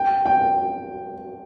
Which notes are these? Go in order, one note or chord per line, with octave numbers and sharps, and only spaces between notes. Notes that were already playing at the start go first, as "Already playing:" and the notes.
Already playing: G5
G5